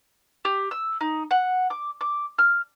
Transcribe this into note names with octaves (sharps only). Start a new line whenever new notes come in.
G4
E6
D#4
F#5
D6
D6
F6